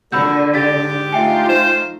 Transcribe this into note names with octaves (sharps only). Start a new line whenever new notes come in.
A#2 D3 F#4 B5 E6 G6
G#2 D4 G4 A6 B6
A3 D#4 F4 E5 G5 G#5
F3 C5